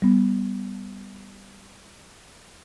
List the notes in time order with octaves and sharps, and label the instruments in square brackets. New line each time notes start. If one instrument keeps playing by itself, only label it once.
[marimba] G3 B3